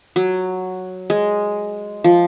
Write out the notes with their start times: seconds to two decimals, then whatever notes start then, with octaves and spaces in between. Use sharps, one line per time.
0.16 F#3
1.10 G#3
2.04 F3